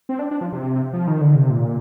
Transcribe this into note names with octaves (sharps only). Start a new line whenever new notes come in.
C4
D4
D4
F3
C3
F3
D#3
D3
C3
A#2